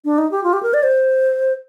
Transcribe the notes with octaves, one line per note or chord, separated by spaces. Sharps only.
D4
D#4
G4
F4
G4
A#4
D5
C5